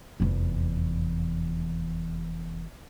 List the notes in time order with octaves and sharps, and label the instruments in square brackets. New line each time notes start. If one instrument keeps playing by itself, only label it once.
[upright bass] F1 E2